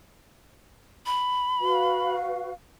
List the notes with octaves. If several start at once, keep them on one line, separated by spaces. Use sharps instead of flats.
B5
F#4 B4 F5